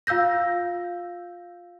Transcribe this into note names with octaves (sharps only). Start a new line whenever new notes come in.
F4 F5 E6 G6 A#6